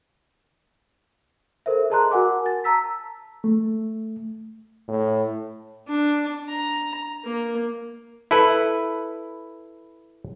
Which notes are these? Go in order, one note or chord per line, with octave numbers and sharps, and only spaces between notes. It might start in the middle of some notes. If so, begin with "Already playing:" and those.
A4 A#4 C5 E5
G#4 D#5 A5 A#5 C6 F#6
F#4 A#4 F#5 G#5 D6
A6
A5 A#5 E6 B6
A3
A2
D4
A#5
A#3
E4 A4 B4